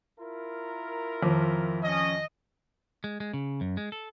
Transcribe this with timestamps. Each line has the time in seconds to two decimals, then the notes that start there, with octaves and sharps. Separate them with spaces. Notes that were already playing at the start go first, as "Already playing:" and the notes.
0.20 E4 F4 A#4
1.23 F2 D#3 F3 D6
1.84 C#4 D#5
3.04 G#3
3.20 G#3
3.33 C#3
3.61 F#2
3.77 G#3
3.92 A4